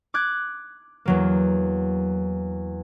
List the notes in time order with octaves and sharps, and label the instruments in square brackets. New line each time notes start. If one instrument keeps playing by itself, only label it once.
[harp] D6 F#6 G#6
E2 F#3 A#3